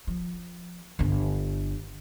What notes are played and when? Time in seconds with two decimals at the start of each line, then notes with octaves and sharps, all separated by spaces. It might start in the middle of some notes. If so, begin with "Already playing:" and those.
0.07 F3
0.99 G1 D3